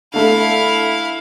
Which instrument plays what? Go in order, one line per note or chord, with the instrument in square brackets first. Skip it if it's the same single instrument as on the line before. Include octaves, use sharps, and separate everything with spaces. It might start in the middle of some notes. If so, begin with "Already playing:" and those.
[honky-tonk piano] D3 A3 [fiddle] E4 F5